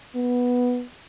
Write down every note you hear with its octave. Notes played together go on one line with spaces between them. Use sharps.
B3